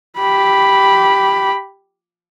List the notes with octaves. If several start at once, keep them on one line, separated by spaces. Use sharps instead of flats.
G4 B5